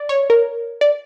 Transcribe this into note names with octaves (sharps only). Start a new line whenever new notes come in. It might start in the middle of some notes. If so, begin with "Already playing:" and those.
Already playing: D5
C#5
A#4
D5